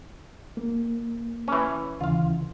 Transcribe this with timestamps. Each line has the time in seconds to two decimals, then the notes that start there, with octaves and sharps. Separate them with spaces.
0.57 A#3
1.48 E3 C#4
2.01 D#2 C#3 E3 F4 F5